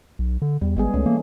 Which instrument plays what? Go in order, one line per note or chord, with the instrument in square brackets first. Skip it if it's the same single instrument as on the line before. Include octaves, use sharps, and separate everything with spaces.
[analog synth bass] B1
D3
[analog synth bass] E2 [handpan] G3
[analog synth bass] G#1 [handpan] G#3 B3 G#4
[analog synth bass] C#2 [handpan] A3 C#4
[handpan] E3 [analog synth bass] A#3